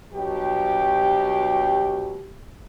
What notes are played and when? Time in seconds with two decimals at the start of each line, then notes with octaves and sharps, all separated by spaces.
0.13 G2 B2 F#3 G4